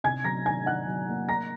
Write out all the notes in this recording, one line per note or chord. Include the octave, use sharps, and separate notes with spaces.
C3 G#5 G#6
F#3 A#5 A#6
D#3 G#5 G#6
D#3 F#5 F#6
F#3
A#3
A#3 A#5 A#6